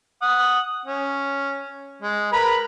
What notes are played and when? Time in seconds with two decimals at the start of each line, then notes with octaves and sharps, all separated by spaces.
0.22 F#5 D#6
0.86 C#4
2.02 G#3
2.33 A#4 B4 B5